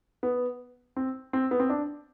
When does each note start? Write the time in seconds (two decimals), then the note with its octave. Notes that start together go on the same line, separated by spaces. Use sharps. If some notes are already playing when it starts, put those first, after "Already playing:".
0.23 B3
0.96 C4
1.33 C4
1.51 B3
1.60 C4
1.70 D4